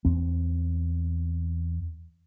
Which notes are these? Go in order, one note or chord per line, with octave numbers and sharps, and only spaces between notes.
E2 C4